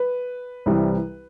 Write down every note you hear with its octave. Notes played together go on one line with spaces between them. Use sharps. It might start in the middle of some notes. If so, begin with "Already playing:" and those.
Already playing: B4
C2 C3 E3 G3